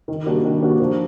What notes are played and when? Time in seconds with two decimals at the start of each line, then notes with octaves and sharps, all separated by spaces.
0.08 D#3
0.26 G3 A#3 D4 F#4
0.44 D#3
0.62 G3 A#3 D4 F#4
0.80 F3